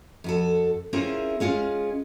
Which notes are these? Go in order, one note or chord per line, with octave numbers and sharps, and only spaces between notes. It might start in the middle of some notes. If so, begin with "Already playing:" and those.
F2 F#4 A4
C4 C#4 E4 F4 G#4 A#4
G#3 C#4 F4 G#4